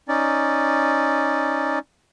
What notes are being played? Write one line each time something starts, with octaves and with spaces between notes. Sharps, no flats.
C#4 D#4 D5